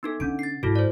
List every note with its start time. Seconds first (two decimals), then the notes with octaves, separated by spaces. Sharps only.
0.03 B3 D#4 A4
0.20 D3 C#4 D7
0.39 A6 C7
0.63 G#2 E4 F#4 A4
0.76 C5 D5